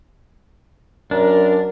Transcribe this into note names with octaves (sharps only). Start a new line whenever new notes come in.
F#2 D4 A#4